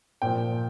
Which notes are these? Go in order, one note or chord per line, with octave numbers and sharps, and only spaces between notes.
A#2 F3 G5